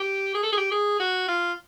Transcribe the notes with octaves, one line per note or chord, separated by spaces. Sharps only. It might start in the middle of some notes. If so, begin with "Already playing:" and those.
Already playing: G4
G#4
A4
G#4
G4
G#4
F#4
F4